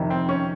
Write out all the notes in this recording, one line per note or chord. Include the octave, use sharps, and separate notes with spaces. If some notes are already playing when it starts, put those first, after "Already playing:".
Already playing: F2 C3 D#3
C4
C#4